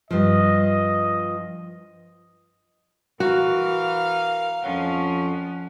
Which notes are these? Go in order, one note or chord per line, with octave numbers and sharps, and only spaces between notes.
G2 F3 D#5
E3 F#4 A#4 F5
F2 F3 C#4 F#5